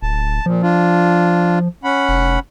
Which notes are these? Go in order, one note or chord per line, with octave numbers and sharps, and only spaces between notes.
D1 A5
A#2 F3
D4 F4
C#4 F#5 B5
F1